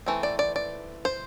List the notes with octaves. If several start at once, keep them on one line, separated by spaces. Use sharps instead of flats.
E3 A3 C4
D5
D5
D5
C5